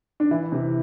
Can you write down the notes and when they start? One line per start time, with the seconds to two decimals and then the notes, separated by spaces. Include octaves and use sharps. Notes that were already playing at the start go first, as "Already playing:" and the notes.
0.20 D4
0.31 E3 E4
0.52 C3